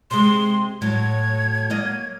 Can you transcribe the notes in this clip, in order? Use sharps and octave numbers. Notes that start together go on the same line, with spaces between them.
C3 G#3 C6
A2 F#3 G#6
F#3 A#3 D#5